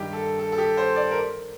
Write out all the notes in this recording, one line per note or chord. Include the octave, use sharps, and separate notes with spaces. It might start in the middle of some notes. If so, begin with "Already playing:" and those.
Already playing: G2 D#3 G3 G4
A4
A4
A4
G4
C5
D5
A#4